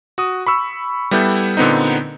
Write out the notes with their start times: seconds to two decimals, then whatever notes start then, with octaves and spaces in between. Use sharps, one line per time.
0.18 F#4 D#6
0.47 B5 C#6 E6
1.11 G3 B3 E4 A4 G6
1.57 A#2 D3 B3 C4 D#4